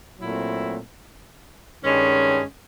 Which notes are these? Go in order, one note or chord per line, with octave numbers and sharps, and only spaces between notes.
A#2 F#3 A3 C4 E4
G2 D#3 G#3 C#4